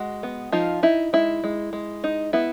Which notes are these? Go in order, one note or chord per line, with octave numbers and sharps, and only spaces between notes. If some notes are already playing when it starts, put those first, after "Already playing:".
Already playing: G#3 F#4
B3
F3 D#4 F4
D#4 E4
G#3 E4
G#3
G#3
D#4
B3 E4